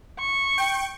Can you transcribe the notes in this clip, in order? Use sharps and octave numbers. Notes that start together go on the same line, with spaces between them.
C#6
G5